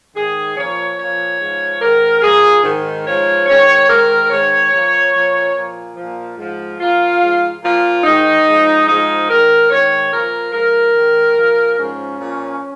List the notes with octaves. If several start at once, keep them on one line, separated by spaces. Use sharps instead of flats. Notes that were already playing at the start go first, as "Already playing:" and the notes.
G#2 D#3 G#4
A#2 F3 C#5
A#2 F3 C#5
G#2 F3
G#2 D#3 A#4
A#2 F3 G#4
G#2 D#3
G#2 F3 C#5
G#2 D#3 C#5
G#2 D#3 A#4
G#2 D#3 C#5
A#2 F3
A#2 F3
A#2 F3
A#2 F3
G#2 F3
A#2 F3 F4
G#2 F3
A#2 F3 F4
G#2 D#3 D#4
G#2 F3
G#2 F3 D#4
G#2 D#3 A#4
G#2 D#3 C#5
A#2 F3 A#4
G#2 F3 A#4
G#2 D#3
A#2 F3
G#2 F3 C#4
A#2 F3